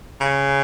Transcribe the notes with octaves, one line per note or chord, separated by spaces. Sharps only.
C#3